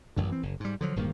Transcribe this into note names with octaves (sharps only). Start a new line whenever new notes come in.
A1 F#2 D3
E3 C4
F#1
G#2 G3
D3 F3 F#3
D1 G2 D#3 A#3